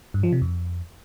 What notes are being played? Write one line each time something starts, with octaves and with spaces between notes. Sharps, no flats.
G2
F3
C3
F2